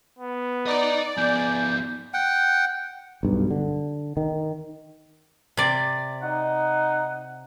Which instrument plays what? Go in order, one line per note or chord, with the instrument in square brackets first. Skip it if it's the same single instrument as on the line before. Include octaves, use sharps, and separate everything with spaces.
[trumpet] B3
[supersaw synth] D5 [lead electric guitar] D#5 A#5
[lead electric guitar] F3 B3 [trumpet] G#5 [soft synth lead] G6
[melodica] F#5 G5
[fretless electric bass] B1 G2
D3
D#3
[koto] C3 D5
[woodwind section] D#4 F#5